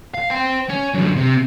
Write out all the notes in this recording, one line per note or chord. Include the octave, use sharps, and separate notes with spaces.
F5
C5 G5
C#4
F#2 D3
C3